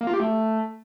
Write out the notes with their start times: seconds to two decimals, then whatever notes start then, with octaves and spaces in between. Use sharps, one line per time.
0.01 A#3
0.07 F4
0.13 G4
0.20 A3